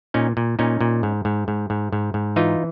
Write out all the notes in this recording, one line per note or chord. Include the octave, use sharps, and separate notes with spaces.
A#2 C#4 D#4
A#2
A#2 C#4 D#4
A#2
G#2
G#2
G#2
G#2
G#2
G#2
E3 D#4 F4